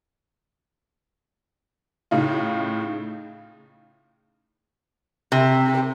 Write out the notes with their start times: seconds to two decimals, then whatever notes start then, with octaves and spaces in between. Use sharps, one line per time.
2.11 A2 C#3 D#4 F4
5.32 C3